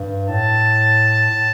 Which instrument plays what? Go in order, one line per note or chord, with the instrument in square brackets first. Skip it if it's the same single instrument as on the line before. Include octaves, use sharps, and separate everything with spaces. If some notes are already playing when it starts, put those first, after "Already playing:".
Already playing: [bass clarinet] G2
[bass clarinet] A2 [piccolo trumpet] A5
[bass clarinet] A2